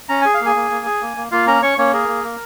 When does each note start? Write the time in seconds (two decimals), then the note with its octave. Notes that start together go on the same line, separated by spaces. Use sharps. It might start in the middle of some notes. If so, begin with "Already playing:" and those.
0.09 C#4 A#5
0.22 G#4 G#5
0.34 F5
0.41 A#3
0.46 G#4 G#5
0.56 A#3
0.71 A#3
0.86 G#4
1.01 A#3
1.17 A#3
1.32 A#3 F4 F5
1.47 C#4 A#4 A#5
1.62 C#4 C#5 C#6
1.78 A#3 C#4 C#5
1.93 G#4 A#4
2.08 A#3
2.24 A#3